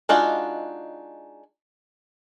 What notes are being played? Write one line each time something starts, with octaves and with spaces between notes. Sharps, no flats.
G#3 D4 D#4 F4 F#4